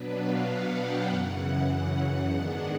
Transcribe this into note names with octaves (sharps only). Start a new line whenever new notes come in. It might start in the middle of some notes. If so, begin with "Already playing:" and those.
Already playing: B2 F#3 B3 D4 B4
F5
F#5
G5
F#2 C#3 E3 F#5
G#2 D#3 G#3 B3 D4